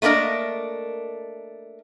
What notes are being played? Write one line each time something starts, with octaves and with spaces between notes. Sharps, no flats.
A3 A#3 D4 A#4 D#5